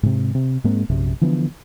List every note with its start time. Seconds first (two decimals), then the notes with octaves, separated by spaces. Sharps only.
0.03 G#2 C3
0.35 C3
0.64 G#2 G#3 A#3 C4
0.89 A#1 F#2 C3
1.21 D3 E3 F3 B3